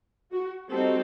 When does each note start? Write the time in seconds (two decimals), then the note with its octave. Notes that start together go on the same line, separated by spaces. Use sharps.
0.32 F#4
0.71 G3 C4 D#4 F#4 A4